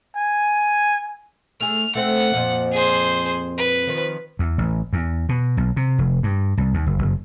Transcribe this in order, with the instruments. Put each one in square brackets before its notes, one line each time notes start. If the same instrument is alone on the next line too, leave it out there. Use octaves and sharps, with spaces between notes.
[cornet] G#5
[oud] A3 G#4 [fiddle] F6
[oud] A3 C4 [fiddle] F#5
[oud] F2 A#2 F3
[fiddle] G#4 C5
B4
[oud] D#3 F3
[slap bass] E2
A1
E2
B2
B1
C3
F1
G2
C2
D#2
F#1
F#1